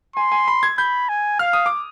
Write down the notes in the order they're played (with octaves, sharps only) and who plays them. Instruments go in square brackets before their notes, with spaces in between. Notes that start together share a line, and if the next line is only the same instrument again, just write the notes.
[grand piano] G#5 [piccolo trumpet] C6
[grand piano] G#5
B5
G#6
[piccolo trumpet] B5 [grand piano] G6
[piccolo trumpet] G#5
[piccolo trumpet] F5 [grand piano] F6
[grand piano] D#6
D6